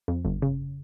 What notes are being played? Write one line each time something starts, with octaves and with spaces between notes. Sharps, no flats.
F2
G1
C#3